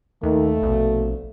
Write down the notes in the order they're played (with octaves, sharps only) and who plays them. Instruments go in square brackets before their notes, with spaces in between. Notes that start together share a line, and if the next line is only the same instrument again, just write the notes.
[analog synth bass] D#2 [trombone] D#3 [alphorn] A3
[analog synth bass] A#1 [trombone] B2